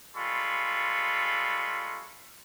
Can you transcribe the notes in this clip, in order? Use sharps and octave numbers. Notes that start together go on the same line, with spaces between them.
G3 G#3 F4 A4 B5 C#6